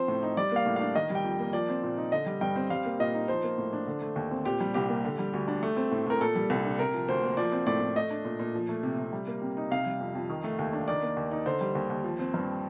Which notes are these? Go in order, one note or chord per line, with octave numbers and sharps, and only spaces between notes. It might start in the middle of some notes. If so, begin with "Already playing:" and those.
Already playing: F3 C4 C5
A2
D#4
G3 D5
A#3 F5
A2
D4 F5
D#3 D#5
G3 G5
F2
A#3
F3 D5
C4
A#2
D#4
D3 D#5
G3
G2 G5
C4
G3 F5
A#3
A#2 D#5
D#4
F3 C5
A#3
A2
D4
D3
A3
D#2
C4
A#2 G4
G3
C2 G4
A#3
D3
G3
D2
D4
A3
C4
A2
A2 A#4
A#2 A4
G3
C2
D4
C3 A#4
F3
D2 C5
A#3
F3 D5
C4
A2 D5
A2
A3 D#5
D4
A#2
A#2
F3
A3
C3
C3
G3
A#3
C3
D#4
C3 F5
G3
F2
F2
D#3
A3
D#2
D4
D#3 D5
A#3
D#2
D#4
D3 C5
G3
D#2
D#2
F3
C4
G2